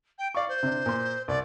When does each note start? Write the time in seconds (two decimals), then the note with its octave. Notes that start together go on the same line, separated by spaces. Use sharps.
0.18 G5
0.35 D5 F5 C#6
0.48 C5
0.63 C3 D4
0.86 A#2 C6
1.28 C2 D5